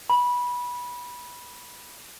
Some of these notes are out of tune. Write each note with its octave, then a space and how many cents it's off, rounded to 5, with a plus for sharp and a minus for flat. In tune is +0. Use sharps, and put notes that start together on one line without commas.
B5 -15